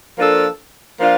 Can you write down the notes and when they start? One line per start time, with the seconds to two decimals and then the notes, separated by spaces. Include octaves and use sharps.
0.17 F3 A#3 D4 F4 A4
0.99 F3 A#3 D4 F4